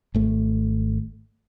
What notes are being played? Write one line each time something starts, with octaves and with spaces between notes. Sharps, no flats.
G#1 A3